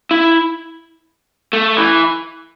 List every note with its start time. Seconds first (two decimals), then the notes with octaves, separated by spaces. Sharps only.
0.11 E4
1.53 A3
1.77 E3